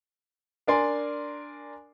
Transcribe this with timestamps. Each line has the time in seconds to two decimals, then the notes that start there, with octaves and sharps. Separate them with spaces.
0.67 D4 A#4 D5 G#5 C6